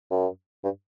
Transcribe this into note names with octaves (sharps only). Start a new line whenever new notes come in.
F#2
G2